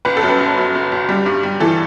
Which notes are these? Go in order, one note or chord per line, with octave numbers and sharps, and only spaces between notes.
F#1 B4
A4
F#2
B4
F#1
F#2
F#1
F#1
G3
G2
G3
E3 A4